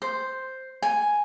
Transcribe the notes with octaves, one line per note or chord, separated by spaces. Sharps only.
C5
G#5